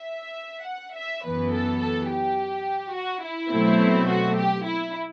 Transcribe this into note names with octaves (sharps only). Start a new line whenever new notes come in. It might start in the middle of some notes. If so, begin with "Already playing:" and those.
Already playing: E5
F#5
E5
F#2 E3 B3 B4
A4
A4
G4
F#4
E4
B2 F#3 A3 C4
F#4
G4
E4